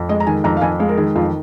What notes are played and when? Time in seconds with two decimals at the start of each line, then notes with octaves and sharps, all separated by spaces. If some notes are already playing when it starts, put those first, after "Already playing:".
Already playing: F2
0.09 G#3 D#5
0.20 A#5
0.27 D#3 G#5
0.44 F2 A#5
0.57 F5
0.62 F2 G#5
0.80 G#3 F5
0.89 A#4
0.97 D#3 G#4
1.16 F2 F4